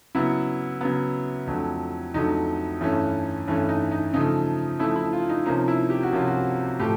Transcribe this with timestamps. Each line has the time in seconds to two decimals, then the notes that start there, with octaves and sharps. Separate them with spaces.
0.15 C#3 F#3 B3 E4
0.81 C#3 F#3 B3
1.47 F2 D3 F#3 A3
2.14 F2 D3 F#3 A3 D#4
2.80 G2 E3 A3 C#4
3.47 G2 E3 A3 C#4
3.69 D#4
3.92 D#4
4.13 C#3 F3 A3 D#4
4.79 C#3 F3 A3 E4
4.96 E4
5.13 F4
5.29 D#4
5.46 C3 F3 A#3 C#4 D#4
5.68 E4
5.90 G4
6.03 F#4
6.13 C3 F3 A#3 C#4 F4
6.28 F#4
6.79 A2 F3 A3 G4